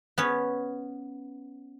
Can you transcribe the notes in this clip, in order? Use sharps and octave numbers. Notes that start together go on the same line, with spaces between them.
B3 C#4 C#5